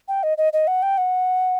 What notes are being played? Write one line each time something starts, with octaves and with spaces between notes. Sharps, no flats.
G5
D#5
D#5
D#5
F#5
G5
F#5